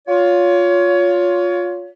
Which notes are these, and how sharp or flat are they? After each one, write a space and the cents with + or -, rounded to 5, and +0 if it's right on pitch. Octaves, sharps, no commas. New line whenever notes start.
F4 +15 C#5 +25